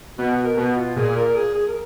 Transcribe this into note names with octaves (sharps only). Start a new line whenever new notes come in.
B2 F#4
F#4
A#4
B2 F#4
F4
A#2 G#4
A#4
G#4
G#4
A#4